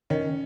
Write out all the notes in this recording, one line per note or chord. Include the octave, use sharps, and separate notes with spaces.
D#3 C#4